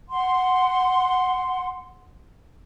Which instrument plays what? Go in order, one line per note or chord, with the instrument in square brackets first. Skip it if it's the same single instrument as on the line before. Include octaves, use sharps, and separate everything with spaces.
[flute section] F#5 C6